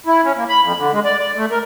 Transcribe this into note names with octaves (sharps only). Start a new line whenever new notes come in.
E4
C#4
A#3
B5
F2
D3
G#3
D5
D5
A3
A#4